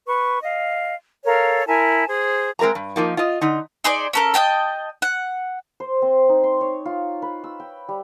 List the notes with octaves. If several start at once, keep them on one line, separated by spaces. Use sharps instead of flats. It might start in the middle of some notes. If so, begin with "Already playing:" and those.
B4 C#6
D#5 F5
A4 A#4 C#5 F5
E4 A#4 G#5 A5
G#4 C5
G#3 C4 A#4 E5 A#5
G2
F3 A#3 D#4
F4 D#5
D3 D#4
D#4 G#4 C5 D5
C#4 A4 A#4
D#5 F5 G5 A5
F#5
C5
C4
D#4
C6
C#5
F4
B4
E6
G5
G3